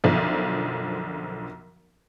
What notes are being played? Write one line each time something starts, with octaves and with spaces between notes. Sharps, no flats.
B1 F#2 D3 F3